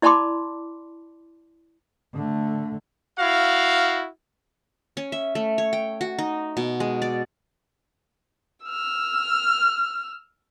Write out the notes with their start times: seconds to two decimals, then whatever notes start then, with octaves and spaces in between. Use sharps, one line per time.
0.02 E4 D5 A5 B5 C6 D6
2.15 D3 A3
3.19 E4 F#4 F5
4.97 C#4
5.12 E5
5.35 A3
5.58 C#5
5.73 G5
6.01 F#4
6.18 D#4
6.57 B2
6.80 G#3
7.02 D5
8.66 E6 F6